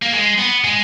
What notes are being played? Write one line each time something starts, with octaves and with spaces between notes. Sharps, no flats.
A#3
G#3
B3
G#3